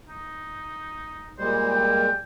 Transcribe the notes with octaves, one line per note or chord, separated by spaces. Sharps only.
D#4
A#2 G3 G#3 C5
G5